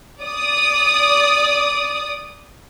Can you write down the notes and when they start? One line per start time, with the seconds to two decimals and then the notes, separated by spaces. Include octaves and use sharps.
0.23 D5 D#6